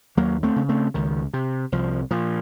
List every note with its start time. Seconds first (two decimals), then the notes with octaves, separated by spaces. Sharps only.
0.17 D#2 F#3 A#3
0.43 A3 C4
0.56 C#3
0.69 A3 C4
0.94 C#2 D#3
1.33 C3
1.72 C2 F3
2.11 A#2 F3